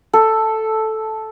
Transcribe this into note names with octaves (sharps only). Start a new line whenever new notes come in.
A4